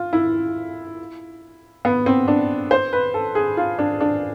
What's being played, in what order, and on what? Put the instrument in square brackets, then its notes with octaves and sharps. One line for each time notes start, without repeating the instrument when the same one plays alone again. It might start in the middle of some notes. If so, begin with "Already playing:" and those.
Already playing: [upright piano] F4
E4
B3
C4
D4
C5
B4
A4
G#4
F4
D4
D4